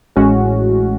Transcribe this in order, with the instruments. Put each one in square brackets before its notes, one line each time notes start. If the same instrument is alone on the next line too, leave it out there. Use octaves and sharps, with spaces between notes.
[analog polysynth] A1 A2 G#3 C#4 F#4